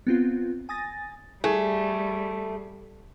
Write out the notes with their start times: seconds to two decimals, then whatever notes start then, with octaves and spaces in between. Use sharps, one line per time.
0.07 B3 C4 F4
0.69 G#5 D#6 A6 A#6
1.44 G3 A3 G#4